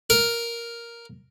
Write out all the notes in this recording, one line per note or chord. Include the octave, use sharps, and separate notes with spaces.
A#4